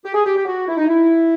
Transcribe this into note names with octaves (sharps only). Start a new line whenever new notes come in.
G4
G#4
G4
G4
F#4
E4
D#4
E4